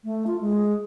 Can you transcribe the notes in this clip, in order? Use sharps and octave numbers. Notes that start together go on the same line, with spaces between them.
A3
F4
G#3